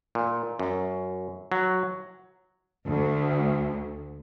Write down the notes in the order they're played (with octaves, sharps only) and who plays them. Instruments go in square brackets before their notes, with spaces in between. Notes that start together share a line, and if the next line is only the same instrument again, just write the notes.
[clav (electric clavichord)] A#2
F#2
F#3
[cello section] D2